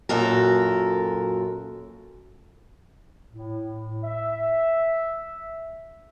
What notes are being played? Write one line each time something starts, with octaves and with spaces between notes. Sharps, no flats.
F#2 A#2 F#4 A4 A#4
A2
E5